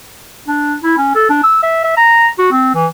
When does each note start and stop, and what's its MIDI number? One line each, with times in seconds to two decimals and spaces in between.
0.48 0.75 62
0.84 0.95 64
0.98 1.14 61
1.15 1.26 69
1.30 1.39 62
1.43 1.58 88
1.63 1.82 76
1.84 1.93 76
1.97 2.27 82
2.38 2.49 66
2.51 2.73 60
2.74 2.86 52